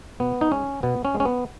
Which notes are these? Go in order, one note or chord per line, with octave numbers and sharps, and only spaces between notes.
B2 B3
D#4
G#3 C#4
B2 B3
C#4
G#3
C#4
B3